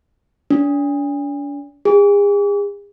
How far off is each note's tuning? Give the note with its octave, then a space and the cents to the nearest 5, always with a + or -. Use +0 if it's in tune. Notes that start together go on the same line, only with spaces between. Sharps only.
D4 -40
G#4 -40